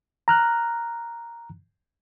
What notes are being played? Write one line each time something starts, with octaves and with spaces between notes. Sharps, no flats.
A#5 F6 F#6